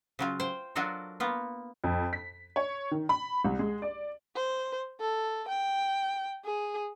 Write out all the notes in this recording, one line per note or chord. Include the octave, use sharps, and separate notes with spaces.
C#3 F#3 F4
C5 G5
F#3 D4 F4 F#4 A4 A#4
A#3 B3 F4
F2
B6
C#5
D#3
B5
C2
G#3
D5
C5
A4
G5
G#4